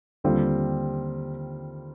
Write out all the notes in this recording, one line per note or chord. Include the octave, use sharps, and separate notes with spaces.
D#2 D3 G3 C4 F4